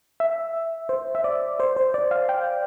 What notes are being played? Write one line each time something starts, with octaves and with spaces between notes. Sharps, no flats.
E5
C5
E5
D5
C5
C5
D5
F5
G5